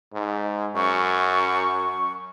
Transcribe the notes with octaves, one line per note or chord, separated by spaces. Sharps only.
G#2
F#2 C#6